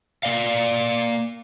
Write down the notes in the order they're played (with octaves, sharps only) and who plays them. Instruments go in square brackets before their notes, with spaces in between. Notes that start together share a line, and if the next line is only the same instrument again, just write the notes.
[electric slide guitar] A#3 D5 F5